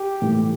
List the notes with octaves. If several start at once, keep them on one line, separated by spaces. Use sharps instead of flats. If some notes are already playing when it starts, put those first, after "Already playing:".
Already playing: G4
A2 E3 A3